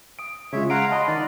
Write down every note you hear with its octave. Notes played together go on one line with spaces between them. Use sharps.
D#6 D7
C#3 G#3 F4 C#5 E5
F5 F#5 A#5 C6 D7
D#5 A5 B5 C6
D#3 D5